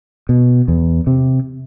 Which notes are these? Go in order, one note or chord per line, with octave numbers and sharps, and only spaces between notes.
B2
E2
C3